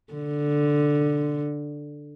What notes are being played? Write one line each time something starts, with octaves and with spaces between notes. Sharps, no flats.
D3